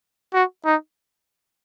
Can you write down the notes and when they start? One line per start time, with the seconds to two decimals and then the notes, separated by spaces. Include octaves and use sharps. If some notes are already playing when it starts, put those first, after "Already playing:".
0.34 F#4
0.66 D#4